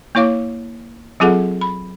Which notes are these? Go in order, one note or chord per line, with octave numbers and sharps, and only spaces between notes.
A#3 E4 C#5 F5 D6
F#3 C4 F4 G#4 A4 F#5
B5